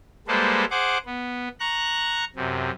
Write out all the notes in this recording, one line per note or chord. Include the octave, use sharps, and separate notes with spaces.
G3 G#3 A#3 A4 B4 C5
G#4 C5 F#5 D6
B3
A#5 C#6 F#6
F#2 C3